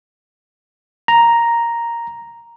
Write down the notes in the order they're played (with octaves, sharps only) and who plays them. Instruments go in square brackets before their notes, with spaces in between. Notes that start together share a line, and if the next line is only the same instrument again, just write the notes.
[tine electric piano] A#5